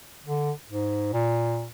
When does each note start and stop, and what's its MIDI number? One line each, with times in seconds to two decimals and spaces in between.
0.24 0.52 50
0.68 1.08 44
1.13 1.68 46